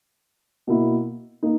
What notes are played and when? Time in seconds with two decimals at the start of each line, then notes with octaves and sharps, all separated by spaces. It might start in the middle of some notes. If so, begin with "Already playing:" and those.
0.67 B2 A#3 E4
1.43 A#3 D#4